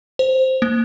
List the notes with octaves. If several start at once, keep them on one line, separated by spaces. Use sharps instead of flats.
C5
A#3